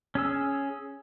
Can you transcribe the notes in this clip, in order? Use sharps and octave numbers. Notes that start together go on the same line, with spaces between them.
C#4 G#4 E6